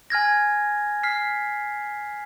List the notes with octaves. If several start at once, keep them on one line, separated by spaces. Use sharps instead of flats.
G#5 F6 G#6 A#6
F6 B6 C7